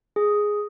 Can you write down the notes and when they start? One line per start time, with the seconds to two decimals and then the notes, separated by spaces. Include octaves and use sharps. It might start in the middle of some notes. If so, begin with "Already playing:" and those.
0.16 G#4